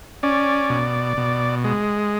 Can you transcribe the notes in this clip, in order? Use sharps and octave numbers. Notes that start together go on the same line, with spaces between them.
C#4 D5
B2
B2
G#3